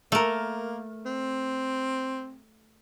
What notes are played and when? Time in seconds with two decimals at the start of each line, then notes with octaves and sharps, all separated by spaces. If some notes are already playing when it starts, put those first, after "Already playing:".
0.12 A3 A#3 A#4
1.06 C4